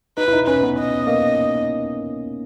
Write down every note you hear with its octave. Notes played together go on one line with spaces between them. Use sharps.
D#4 B4
E4
D#4
C#4 B4
B3
D#5
A#3